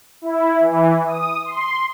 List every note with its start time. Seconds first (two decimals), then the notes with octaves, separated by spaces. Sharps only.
0.22 E4
0.60 E3
1.05 D#6
1.45 C6